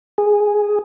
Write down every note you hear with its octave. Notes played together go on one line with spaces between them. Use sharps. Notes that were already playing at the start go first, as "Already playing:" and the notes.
G#4